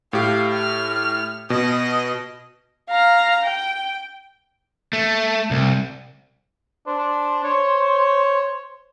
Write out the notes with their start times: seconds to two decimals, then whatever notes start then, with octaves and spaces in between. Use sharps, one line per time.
0.13 A2 G4 F5
0.52 F6
1.50 B2 D#5
2.90 F5 A#5
3.44 G5
4.93 A3
5.51 C2
6.87 D4 C5
7.44 C#5